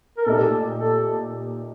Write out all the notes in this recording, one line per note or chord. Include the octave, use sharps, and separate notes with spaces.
A#4
A#2 A3 D#4 G4 A4
A4